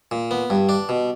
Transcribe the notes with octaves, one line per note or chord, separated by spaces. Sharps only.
A#2
B3
G2
D4
B2